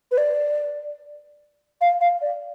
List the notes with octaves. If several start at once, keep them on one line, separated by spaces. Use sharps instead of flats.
B4
D5
F5
F5
D5